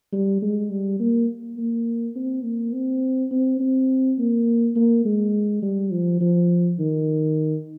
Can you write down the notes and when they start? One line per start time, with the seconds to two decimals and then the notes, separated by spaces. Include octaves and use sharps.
0.12 G3
0.42 G#3
0.70 G3
1.00 A#3
1.57 A#3
2.15 C4
2.44 A#3
2.73 C4
3.31 C4
3.60 C4
4.18 A#3
4.76 A#3
5.05 G#3
5.62 G3
5.91 F3
6.21 F3
6.79 D#3